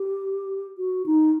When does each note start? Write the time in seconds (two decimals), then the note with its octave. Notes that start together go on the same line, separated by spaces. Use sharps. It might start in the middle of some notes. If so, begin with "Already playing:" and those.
Already playing: G4
0.78 F#4
1.06 D#4